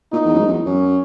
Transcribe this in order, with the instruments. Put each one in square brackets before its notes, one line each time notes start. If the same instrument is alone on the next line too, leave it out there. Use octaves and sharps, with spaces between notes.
[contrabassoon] A#2 [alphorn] D#4
[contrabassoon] E2
F#2
G#2
F#2
E2
[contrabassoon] F#2 [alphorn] C#4